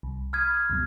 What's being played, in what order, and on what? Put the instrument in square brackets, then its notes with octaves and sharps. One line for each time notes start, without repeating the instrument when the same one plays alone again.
[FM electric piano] C2
[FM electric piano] B5 D#6 [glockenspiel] F6 G#6
[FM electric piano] C#2 F#2 B2